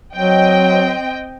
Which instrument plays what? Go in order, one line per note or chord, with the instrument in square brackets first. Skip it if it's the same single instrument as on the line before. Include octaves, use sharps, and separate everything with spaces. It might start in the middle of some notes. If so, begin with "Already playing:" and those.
[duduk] F#3 [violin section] C4 D#5 G5